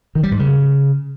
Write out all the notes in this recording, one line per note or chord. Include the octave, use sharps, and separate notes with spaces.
D#3
G3
G#2
C#3